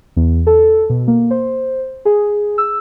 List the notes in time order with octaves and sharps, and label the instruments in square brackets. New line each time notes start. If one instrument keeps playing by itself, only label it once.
[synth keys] E2
A4
B2
A#3
C5
G#4
E6